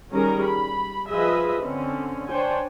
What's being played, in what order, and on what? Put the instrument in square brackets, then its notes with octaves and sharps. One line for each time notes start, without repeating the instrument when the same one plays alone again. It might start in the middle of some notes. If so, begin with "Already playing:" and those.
[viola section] D#3 G3 C#4 G#4 A#4 A#5
B5
F3 F4 G#4 B4 D#5 E5
D3 C4 C#4
D4 C5 C#5 G5 G#5